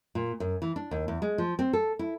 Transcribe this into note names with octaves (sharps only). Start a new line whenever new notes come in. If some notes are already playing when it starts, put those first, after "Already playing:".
A#2
F#2
E3
D4
D#2
E2
G#3
F3
C4
A4
E4